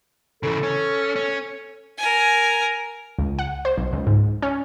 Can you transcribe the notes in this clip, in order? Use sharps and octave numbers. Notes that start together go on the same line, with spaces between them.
C#3 E3 A4
C#4
C#4
A#4 G#5
C#2
F#5
C5
B1
C#2
G#2
C#4